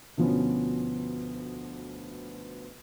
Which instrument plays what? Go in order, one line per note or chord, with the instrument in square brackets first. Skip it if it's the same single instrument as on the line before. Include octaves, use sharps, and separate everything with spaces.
[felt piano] D2 B2 F3 B3 C#4